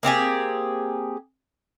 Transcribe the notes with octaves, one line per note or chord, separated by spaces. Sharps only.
A#3 C4 G4 G#4